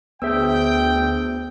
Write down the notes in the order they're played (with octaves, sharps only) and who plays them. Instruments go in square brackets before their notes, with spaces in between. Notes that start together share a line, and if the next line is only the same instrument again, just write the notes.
[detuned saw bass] D2 [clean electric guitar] B3 E5 [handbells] G#4 C5 E6 [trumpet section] G5